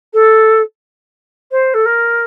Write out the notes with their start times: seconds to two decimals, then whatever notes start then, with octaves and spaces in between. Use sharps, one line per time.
0.13 A4
1.51 C5
1.74 A4
1.85 A#4